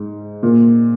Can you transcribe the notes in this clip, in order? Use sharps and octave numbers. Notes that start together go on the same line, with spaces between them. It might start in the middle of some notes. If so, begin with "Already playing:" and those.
Already playing: G#2
A#2